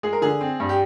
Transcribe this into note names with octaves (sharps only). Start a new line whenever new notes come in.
G#3 G#4
A#4
D3 G#4
C4
G2
G4